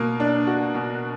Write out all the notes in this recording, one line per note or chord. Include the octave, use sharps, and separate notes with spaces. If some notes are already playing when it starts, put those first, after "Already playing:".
Already playing: B2 A#3
D4
F#4
B2